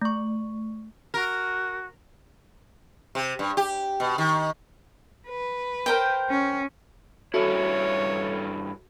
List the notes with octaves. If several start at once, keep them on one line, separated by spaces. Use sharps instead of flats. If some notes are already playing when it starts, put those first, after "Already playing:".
A3 C#6
F#4 A#4
C3
G2
G4
B2
D#3
B4
A#4 C5 G5
C#4
G2 C#4 E4 F#4 A4 C#5